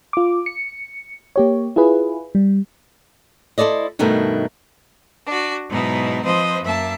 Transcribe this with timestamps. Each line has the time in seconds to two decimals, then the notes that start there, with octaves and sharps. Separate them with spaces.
0.13 F4 D6
0.46 C#7
1.36 A#3 G4 C#5
1.76 E4 F4 G#4 B4
2.35 G3
3.58 E4 A4 C5 D5 D#5
3.99 G2 B2 D#3 A3 D#4
5.27 D4 F#4
5.69 G#2 B2 F#3 D#4 E4
6.24 F3 C4 B4 C5 D#5
6.62 F#2 A#3 E5 A5